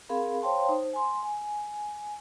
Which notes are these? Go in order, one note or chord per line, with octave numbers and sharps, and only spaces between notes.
C4 G#4 A#4 F5 B5
C5 C#5 F5 G5 A5 C6
D#4 C5
G#5 C6
G#5